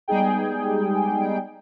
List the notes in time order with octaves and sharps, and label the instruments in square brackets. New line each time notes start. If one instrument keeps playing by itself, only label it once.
[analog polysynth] G3 G#3 B3 D#4 G#4 G5